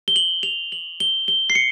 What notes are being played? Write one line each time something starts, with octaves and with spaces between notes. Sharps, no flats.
G7
F#7
F7
F#7
G7
G7
C7
C#7